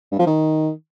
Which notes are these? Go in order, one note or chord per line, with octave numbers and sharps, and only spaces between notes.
G2
F3
D#3